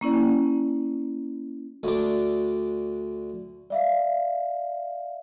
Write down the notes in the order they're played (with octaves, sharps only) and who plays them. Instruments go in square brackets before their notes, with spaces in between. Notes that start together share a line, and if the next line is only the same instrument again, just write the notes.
[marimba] A#3 C#4 E4 D5
[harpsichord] D2 D4
[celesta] D5 E5 F5